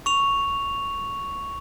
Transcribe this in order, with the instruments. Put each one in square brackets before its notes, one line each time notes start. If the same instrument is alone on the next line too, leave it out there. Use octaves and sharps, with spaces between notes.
[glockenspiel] C#6 F7